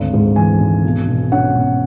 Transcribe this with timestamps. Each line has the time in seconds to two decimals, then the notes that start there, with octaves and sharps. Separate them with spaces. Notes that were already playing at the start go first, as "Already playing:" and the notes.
Already playing: G#1 D2
0.14 G#2
0.36 E3 G#5
0.60 G#1
0.84 B1
1.08 B2
1.32 C#4 F#5
1.55 B1